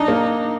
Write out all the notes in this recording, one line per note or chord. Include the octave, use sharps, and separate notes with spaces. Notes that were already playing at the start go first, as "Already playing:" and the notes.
Already playing: D4 D#4
A#3